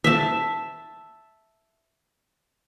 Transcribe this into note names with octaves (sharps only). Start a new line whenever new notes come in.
E5 A5